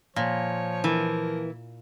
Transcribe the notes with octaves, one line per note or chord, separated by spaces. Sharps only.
A#2 F3 C#5
E3 A#3